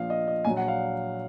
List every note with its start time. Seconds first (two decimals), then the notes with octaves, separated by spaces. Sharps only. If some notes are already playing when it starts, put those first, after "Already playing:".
Already playing: A#1 A#2 F3 F5
0.10 D#5
0.28 D#5
0.45 A#1 A#2 F#3 G#5
0.57 F#5
0.68 F5